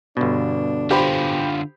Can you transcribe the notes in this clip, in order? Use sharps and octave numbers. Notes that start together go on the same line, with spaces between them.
G1 B2 D4
D3 F4 G4 C5 B5